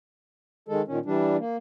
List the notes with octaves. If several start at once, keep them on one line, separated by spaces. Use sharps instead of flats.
D#3 G#3 A4
A#2 D#3 C#4
E3 G3 D4
A#3